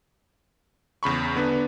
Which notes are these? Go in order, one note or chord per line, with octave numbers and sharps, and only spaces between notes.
E2 C#3 B5 C#6
D3 B3 D4 B4